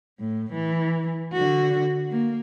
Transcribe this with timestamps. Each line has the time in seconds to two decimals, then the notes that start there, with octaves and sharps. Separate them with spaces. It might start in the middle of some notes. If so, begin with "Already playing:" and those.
0.19 A2
0.53 E3
1.33 D3 F#4
2.10 A#3